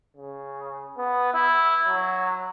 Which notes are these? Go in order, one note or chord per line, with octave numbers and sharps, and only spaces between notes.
C#3
B3
E4
F#3